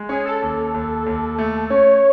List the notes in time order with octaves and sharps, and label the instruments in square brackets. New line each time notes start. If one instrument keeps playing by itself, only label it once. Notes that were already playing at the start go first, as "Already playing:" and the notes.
Already playing: [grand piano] G#3
[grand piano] C#4 [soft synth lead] G#4
[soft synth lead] A4
[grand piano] D#2
D#2
D#2
A3
[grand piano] C#4 [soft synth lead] C#5